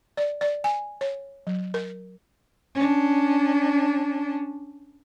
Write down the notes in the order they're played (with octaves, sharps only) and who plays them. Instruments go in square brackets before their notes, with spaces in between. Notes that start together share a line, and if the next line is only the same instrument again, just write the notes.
[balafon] D5
D5
G#5
C#5
F#3
A#4
[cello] C#4 D4